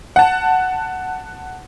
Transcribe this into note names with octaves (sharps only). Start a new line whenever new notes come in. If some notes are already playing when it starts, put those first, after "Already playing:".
F#5 A5